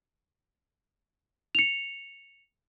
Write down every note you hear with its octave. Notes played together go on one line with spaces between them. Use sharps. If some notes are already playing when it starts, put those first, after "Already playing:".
C#7 F7